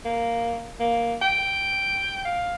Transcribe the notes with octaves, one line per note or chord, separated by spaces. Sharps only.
A#3
A#3
G5
F5